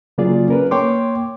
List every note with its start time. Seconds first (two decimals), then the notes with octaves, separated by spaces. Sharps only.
0.18 C#3 F#3 A#3 F4 G#4 D5
0.48 C#4 A#4 B4
0.71 A#3 C#5 G5 C6 D6